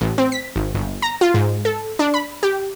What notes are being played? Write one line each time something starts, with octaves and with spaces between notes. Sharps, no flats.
A1
C4
B6
G#1
G1
A#5
F4
G#2
A4
D4
B5
G4